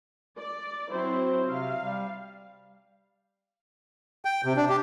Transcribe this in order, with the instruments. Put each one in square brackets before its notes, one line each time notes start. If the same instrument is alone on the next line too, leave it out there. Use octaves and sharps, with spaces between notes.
[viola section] D5
[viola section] F#3 C4 E4 [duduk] C5
[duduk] C3 [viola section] F5
[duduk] G3
[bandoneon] G5
C3
D4
G4